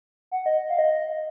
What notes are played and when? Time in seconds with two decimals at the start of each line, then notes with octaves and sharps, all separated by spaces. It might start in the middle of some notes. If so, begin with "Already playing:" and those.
0.31 F#5
0.46 D#5
0.69 F5
0.79 D#5